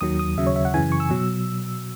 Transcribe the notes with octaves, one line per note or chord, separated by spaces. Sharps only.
D#2 D#3 F#3 D#6
D#6
D#2 C#3 F#3 E5
C#5
E5
F#5
F#2 C#3 E3 G#5
C#6
E6
B2 F#3